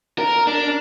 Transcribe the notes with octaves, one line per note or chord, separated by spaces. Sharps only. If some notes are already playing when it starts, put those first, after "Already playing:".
A#4
D4